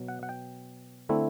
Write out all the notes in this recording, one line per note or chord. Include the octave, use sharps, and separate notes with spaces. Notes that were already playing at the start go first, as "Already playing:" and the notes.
Already playing: B2 F#3
F#5
F#5
G5
D3 A3 C4 E4